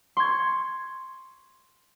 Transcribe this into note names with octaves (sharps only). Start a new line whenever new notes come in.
C6 C#6 G#6